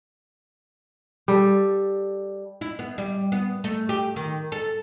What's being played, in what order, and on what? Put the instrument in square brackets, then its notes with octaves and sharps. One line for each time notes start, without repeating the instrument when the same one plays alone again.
[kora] G3 A4
[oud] E4
B3
G3
B3
A3
G4
D#3
A4